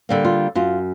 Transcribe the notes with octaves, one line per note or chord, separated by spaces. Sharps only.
D3 G3 A#3
F4
F#2 F4